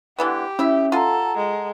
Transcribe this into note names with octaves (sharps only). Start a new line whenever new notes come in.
D3 E3 B3 G4
C#4 E4 E5
F4 A4 F#5 A#5 C6
G#3